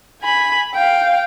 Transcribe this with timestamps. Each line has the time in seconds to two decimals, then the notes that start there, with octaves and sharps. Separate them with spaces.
0.21 G#5 B5
0.74 F5 G5